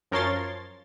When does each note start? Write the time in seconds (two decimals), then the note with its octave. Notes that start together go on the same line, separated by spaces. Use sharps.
0.11 F#2 F3 A#4 C#5 C6 A6